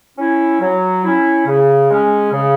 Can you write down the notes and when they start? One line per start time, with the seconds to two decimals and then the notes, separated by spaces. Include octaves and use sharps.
0.17 C#4 E4
0.61 F#3
1.04 C#4 E4
1.47 C#3
1.89 G#3 C#4
2.32 C#3